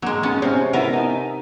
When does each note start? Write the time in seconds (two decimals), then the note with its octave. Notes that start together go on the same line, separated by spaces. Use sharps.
0.02 F#3 G#3 A#3
0.23 G#3 B3 C#4 D#4
0.42 C3 C#4 C#5
0.73 B3 E4 A#4 E5
0.93 D#4 G#5